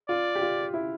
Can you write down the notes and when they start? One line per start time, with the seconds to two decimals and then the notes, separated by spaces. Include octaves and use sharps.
0.09 F4 D5
0.36 G4
0.41 F4
0.74 E4